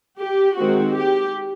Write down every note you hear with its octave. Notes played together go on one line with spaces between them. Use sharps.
G4
D#3 G#3 C4 F#4
G4